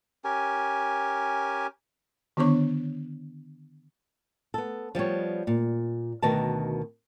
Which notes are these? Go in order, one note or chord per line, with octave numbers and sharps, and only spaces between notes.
C#4 G4 A#4 G#5
D3 D#3 B3 D4 C#5 C#6
B3 A4
F3 G3 B3 C#5
A#2
D2 B2 D#3 A#4 B4 A5